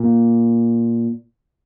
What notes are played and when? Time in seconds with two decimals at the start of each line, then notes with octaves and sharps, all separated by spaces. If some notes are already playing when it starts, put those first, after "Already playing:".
Already playing: A#2